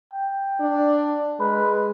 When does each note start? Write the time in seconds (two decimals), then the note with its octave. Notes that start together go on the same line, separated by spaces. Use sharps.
0.13 G5
0.60 D4
1.40 G#3 B4